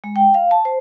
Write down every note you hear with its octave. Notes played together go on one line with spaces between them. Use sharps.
G#3
G5
F5
A5
C5